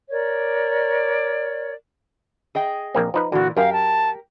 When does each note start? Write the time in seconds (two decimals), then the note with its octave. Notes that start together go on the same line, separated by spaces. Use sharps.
0.10 A#4 C#5 D5
2.55 G#4 D#5 G5
2.95 A#1 A#3 C4
3.14 F3 D#4 B4
3.32 A#2 D3 E3 F#4
3.57 F#2 G4 A#4 F5
3.73 A5